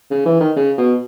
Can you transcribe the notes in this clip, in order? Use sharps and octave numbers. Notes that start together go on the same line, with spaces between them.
C#3
E3
D#3
C#3
B2